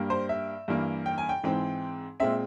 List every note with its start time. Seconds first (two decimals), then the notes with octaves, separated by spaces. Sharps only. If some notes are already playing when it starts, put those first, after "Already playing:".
Already playing: G2 G3 A#3
0.10 C5
0.29 E5
0.68 G2 E3 A#3
1.06 G5
1.18 G#5
1.29 G5
1.44 G#2 E3 G#3 C4
2.20 A#2 G#3 C4 E5